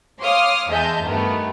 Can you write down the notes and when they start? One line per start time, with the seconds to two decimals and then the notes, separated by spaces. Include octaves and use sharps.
0.20 C#5 F5 C6 D6 D#6 F6
0.70 E2 G#3 D#5 E5 A5 G6
1.05 G2 D#3 A3 B3